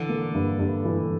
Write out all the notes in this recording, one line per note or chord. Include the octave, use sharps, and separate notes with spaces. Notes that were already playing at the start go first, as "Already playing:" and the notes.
Already playing: D3 E3
A#3
G2
G2
E3